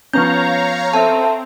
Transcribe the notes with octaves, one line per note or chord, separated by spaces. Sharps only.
F3 B3 C#4 C#5 F5 A#5 G6
C4 A4 E5 A5